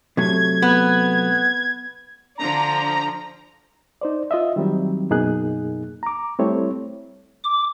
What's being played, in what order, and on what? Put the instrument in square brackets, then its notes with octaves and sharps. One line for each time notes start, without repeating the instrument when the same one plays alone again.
[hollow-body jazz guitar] C3 F#3 A3 [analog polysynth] G#6
[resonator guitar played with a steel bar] B3
[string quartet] D3 F3 D4 [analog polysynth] A#5
[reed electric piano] D#4 C5 D5
F4 D#5 E5
D#3 F#3 G3 C4
F#2 B2 A#3 D#4 G#4 F#6
A#5 D6
G3 A3 C4 E4 C#5
[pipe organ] D6